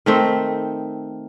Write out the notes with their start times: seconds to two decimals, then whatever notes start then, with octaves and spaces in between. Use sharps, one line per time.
0.06 D#3 A3 C4